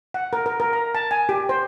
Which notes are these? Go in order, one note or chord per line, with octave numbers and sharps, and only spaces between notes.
F#5
A#4
A#4
A#4
A#5
A5
G#5
G4
C5